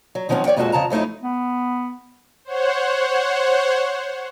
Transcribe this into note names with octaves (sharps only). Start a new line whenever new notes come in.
F#3
D#3 F3 F#3 C4 C#4
C#5 D5 F#5 G5
F2 A#2 G#3 D4 F#4 A4
F2 C#3 A5 A#5
F2 F#3 A3 D#4 E4
B3
C5 C#5 F#5